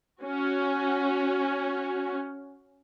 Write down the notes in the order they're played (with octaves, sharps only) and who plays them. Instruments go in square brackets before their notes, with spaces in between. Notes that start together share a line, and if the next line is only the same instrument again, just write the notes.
[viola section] C#4 F#4